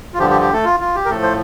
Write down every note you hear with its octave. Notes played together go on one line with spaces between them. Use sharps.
F4
G2 D3 F3 G4
G4
G4
A3 A4
F4
F4
G4
A#4
A2 F3 A3 A4
C5